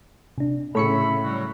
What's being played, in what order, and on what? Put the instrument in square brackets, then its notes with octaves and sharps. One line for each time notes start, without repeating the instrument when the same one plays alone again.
[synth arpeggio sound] C3 D4
[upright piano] A2 C#3 [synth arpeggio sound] A4 C#6 C#7 [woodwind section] E5 B5
[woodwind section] F#3 G3 F#4